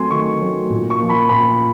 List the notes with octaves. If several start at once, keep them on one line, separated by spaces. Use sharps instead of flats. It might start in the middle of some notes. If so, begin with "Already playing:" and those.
Already playing: F#3 A3 C4 G#5 C6
D#3 C#6
F#3 A3 C4
A#2
C#6
F3 A#3
B5
A#2 B5